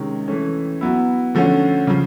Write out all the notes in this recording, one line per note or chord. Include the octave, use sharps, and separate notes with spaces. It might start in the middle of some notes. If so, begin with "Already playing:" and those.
Already playing: C3 D#3 G#3 C#4
E3 A3 C#4
F#3 B3 E4
D3 F3 A3 C#4 F#4
C#3 F3